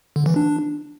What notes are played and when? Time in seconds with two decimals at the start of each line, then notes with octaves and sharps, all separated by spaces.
0.16 D3
0.26 E3
0.36 D4